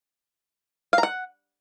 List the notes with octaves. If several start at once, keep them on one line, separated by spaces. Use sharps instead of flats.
F5
A#5
F#5